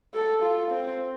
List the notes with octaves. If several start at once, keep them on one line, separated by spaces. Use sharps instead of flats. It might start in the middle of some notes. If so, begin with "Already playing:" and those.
A4
F4
C4